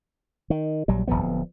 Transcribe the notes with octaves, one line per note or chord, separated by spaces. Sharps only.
D#3
A#1 F#3 G3
D1 A#1 F3 B3